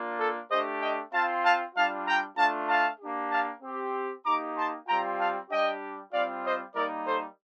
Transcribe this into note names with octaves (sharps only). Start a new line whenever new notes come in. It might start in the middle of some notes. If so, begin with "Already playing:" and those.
Already playing: A#3 D4 F4
A4
A3 D4 G4 C5 D#5
D#5 G5
C4 F4 F5 A5
F5 A5
G3 D4 F4 F5 A5
G5 A#5
A3 D4 F4 F5 A5
F5 A5
A#3 D4 G4
F5 A5
C4 G4
A#3 D#4 G4 A#5 D6
A5 C6
G3 C4 F4 G5 A#5
F5 A5
G3 D4 G4 D#5 G5
G3 C4 F4 D5 F5
C5 D#5
G3 A#3 D#4 A#4 D5
A4 C5